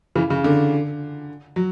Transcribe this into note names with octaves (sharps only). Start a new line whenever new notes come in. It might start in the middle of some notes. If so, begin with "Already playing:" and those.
C#3 E3
C#3
D3
F#3